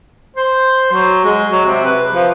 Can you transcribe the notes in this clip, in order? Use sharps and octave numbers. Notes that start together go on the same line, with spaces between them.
C5
F#3
G#3
F#3
C3
B4
F3